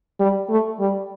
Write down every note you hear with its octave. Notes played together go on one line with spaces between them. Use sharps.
G3
A3
G3